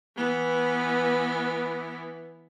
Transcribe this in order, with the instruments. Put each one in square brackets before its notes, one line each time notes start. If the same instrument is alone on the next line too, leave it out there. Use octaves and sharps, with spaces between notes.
[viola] E3 B3